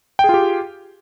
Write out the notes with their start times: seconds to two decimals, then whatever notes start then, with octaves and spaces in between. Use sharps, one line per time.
0.19 G5
0.24 G#4
0.29 F4
0.34 G4